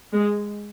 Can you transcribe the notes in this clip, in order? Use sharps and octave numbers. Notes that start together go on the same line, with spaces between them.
G#3